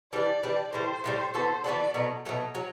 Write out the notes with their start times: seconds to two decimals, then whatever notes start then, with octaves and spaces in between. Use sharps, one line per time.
0.13 E3 G3 D4 D5
0.43 E3 G3 D4
0.73 A2 E3 G3 C5
1.03 A2 E3 G3 C5
1.34 E3 B3 F#4 A4 C5
1.64 E3 B3 F#4 A4 D5
1.94 B2 F#3 A3
2.25 B2 F#3 A3
2.55 F#3